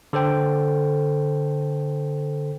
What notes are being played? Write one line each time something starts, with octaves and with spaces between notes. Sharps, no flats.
D3 A4 C5 G5